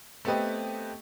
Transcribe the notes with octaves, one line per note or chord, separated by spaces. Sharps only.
A3 B3 C4 G4 B4 D#5